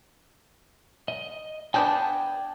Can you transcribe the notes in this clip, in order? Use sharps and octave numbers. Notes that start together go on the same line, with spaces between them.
D#5
B3 D4 G#4 G5 A5 G6